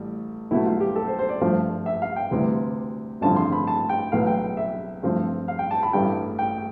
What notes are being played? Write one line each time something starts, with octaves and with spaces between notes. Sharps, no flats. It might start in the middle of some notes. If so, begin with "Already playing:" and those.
Already playing: A1 G3
B1 B2 A3 E4
F4
G4
A4
C5
C5
D5
G2 F3 A3
E5
F5
G5
D2 C3 E3 G3
A1 G2 D3 F3 C4 A5
C6
B5
A5
G5
B1 A2 E3 F5
G5
E5
G2 F3 A3 C4
F5
G5
A5
B5
A1 G2 E3 G3 G5
G5